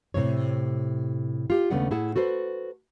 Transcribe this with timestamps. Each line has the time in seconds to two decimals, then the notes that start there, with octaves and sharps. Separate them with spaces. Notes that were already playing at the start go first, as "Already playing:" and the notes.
0.14 A2 C3 F3 C#5
1.50 F4 G4
1.70 D#2 C#3 A3 B3 D4 F#5
1.91 A2 E4 G#4 F#5 A5
2.16 F#4 A4 B4 C5